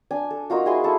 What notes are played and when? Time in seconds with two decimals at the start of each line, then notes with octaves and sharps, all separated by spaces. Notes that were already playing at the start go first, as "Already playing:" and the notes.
0.11 D4 G#5
0.30 A4
0.50 A#3 D#4 F4 F#4
0.66 E4 G#4 G#5 C6
0.84 E4 A4